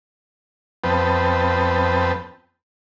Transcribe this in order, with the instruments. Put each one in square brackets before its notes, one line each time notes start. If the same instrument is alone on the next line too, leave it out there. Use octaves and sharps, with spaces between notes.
[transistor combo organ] F2 B3 C4 B4 G5 A5